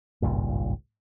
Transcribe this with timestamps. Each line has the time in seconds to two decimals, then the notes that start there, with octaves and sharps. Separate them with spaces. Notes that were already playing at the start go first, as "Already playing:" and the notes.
0.22 G#1 C#2 G2 A#2